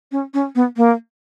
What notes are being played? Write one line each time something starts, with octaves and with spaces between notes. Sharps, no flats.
C#4
C#4
B3
A#3